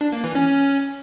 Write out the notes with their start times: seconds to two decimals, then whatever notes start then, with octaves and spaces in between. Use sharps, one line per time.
0.01 D4
0.12 A#3
0.24 E3
0.35 C#4